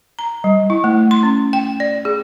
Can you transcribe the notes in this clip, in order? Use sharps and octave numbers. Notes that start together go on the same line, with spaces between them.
A#5
G3
E4
A3
C6
C#4
G5
D5
G#4